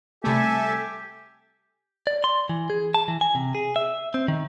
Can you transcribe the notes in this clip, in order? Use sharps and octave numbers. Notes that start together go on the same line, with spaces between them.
C3 G3 A3 G4 A4 E5 G#5
D5
C6
E3
G#4
A5
E3
G#5
C3
G#4
E5
C4
D#3